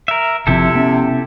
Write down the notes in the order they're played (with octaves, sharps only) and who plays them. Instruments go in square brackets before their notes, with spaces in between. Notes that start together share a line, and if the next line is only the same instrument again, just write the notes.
[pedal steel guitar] A#4 E5
[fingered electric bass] F#1 F3 C4 [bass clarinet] C3 [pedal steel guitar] E4 G4 A4
[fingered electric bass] B3 C#4